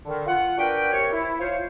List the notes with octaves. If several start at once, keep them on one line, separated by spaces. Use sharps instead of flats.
D3 D#3
F4 F#5
D4 F#4 A#4 B4 G5
C3 C4 A#4 C#5
E4
F4 C5 C#5